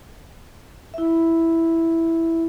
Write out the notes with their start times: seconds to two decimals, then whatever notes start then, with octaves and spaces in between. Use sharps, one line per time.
0.94 E4 E5